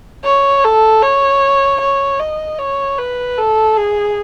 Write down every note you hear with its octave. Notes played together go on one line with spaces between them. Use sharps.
C#5
A4
C#5
C#5
D#5
C#5
B4
A4
G#4